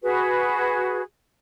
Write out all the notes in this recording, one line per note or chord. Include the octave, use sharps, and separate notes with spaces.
F#4 G#4 B4